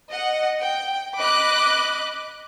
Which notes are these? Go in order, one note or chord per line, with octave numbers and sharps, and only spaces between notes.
D#5 F#5
G5
D#5 B5 D6 F#6